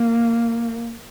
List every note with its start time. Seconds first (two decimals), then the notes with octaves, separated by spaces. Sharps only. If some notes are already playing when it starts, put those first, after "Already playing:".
Already playing: A#3